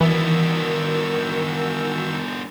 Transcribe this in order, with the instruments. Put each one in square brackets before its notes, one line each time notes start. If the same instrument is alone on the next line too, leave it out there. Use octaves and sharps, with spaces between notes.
[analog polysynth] D#3 F#4 E6 [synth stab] E3 [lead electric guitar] B3 D4 [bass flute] A#4